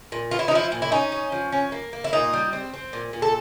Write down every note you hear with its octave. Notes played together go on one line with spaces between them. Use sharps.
A#2
B3 F4
E4
D#4
F3 E4
A#2
E4
C#4 D#4
C#4
F3
C#4
A#3
A#3
E4
A#2 D#4
G3
C4
C4
A#2
A#2
A4